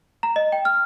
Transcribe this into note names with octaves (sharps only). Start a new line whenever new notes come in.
A#5
D#5
G5
F6